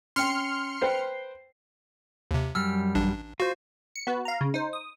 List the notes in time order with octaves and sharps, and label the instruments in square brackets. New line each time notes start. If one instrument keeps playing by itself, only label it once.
[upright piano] C#4 G5 [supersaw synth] C6 F6 C#7
[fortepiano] B4 C5 G5 [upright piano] C7
[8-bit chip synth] D#2 C3
[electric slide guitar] F#2 G3 [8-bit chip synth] E6 F6
[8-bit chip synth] A1 D4
[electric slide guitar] F4 C5 [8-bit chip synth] F#4
[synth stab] C#7
B3 F#4 B4
F5 A#5
C#3
D#4 C5
D#6